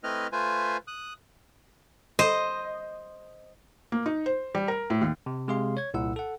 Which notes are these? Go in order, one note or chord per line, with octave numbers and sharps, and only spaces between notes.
A3 C4 E4 B4 D#5 F6
A3 F4 B4 C5 G#5
D#6 F#6
C5 D#5
A#3
D#4
C5
G3
A#4
A2
D#2
C3
C3 G#3 G#4 F5 C6
C#5 G#6
C2 A#2 E4 F#5 E6
A4 F#5